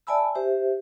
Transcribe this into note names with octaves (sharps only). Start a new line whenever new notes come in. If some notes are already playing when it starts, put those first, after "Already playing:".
D5 E5 G#5 A5 B5 E6
G4 C5 E5